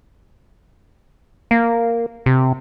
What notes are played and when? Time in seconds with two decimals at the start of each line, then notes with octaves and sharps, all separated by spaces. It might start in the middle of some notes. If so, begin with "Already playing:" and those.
1.51 A#3
2.26 C3